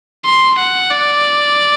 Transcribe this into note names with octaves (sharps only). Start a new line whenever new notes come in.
C6
F#5
D5